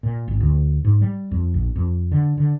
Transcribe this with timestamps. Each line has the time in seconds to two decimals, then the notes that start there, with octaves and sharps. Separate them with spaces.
0.03 A#2
0.28 G#1
0.40 D2
0.85 G#2
1.01 G3
1.31 F2
1.54 A#1
1.76 F2
2.12 D3
2.37 D3